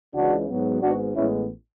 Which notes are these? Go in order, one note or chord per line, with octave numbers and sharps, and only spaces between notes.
C#2 C#3 E3 G#3 D4 F#4
G#2 F#3 B3
G#1 G#2 G#3 B3 D4 F#4
A1 A2 G#3 B3 C#4 E4